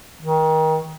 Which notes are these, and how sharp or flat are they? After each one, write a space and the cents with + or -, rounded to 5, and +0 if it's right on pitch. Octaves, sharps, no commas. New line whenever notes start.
D#3 +25